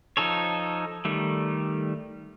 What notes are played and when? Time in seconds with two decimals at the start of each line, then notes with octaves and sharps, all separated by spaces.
0.17 F3 D#4 A4 C#5
1.05 D#3 G3 A3